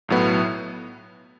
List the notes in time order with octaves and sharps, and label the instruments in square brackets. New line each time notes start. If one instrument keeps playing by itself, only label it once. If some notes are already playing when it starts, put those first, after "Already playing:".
[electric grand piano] B1 A2 F#3 B3 E4